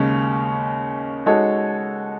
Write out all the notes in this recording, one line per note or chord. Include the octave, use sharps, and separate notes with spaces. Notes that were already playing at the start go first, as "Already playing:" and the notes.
Already playing: D#2 C#3 G#3 C#4
G#3 D#4 F#4 A4 C#5